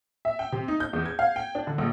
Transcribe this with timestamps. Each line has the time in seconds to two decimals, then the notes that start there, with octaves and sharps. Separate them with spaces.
0.25 E5
0.39 G5
0.52 C3
0.68 D#4
0.80 G6
0.93 E2
1.06 G#6
1.19 F5
1.36 G5
1.55 D4
1.67 D3
1.78 A#1